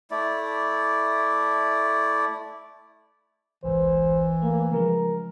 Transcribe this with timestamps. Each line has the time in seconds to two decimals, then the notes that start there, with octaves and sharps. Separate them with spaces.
0.11 A3 E4 D5
3.64 G#1 C#2 G#2 E3 C5
4.42 A3 A#3
4.71 C#3 F3 G#3 A#4